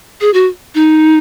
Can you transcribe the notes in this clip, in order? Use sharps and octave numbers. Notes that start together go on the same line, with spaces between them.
G#4
F#4
D#4